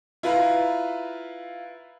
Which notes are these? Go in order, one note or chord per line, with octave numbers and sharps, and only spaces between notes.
E4 F4 B4 F5 A#5 B5